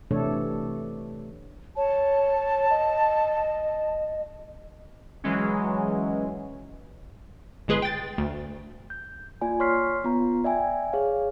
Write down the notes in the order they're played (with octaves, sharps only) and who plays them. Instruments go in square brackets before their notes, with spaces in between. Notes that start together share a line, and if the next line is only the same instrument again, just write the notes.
[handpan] C3 E3 A3 D4 A4 C#5
[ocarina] C#5 [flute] A5
[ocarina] D#5
[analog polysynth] E3 F#3 G#3 C#4
[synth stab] G1 G#3 G#4 B4 C6
G5 A6
D2
[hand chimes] G6
A#3 F4 D5 G#5
C#5 C6 C#6 F6 B6 C7
B3 F4 A#5
D5 E5 G5 G#5
G#4 C#5 F5